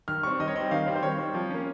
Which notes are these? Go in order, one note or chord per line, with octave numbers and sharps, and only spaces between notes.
D#3 F6
G3 C4 C#6
D#3 D#5
C#5
G3 C4 D#5
D#3 F5
G3 C4
C5
D#3 C#5
G3 C4
F3
A#3 C#4